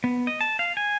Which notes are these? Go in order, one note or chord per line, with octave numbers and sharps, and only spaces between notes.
B3
D#5
A5
F5
G#5